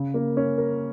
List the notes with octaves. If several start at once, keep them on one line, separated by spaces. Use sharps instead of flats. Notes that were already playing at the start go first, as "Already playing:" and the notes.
Already playing: C#3
A#3
C#4
A#4